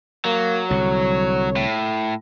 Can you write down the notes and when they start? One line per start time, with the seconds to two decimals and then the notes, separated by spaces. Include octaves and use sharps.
0.25 F#3 A#3
0.70 C2 D3 C#5
1.57 A2